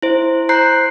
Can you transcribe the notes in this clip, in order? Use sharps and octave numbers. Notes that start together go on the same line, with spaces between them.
E4 C5
C5 A#5 F#6 G6 C7